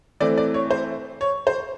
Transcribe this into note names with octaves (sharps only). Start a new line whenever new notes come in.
E3 A3 C4 D5
D5
C#5
C5
C#5
C5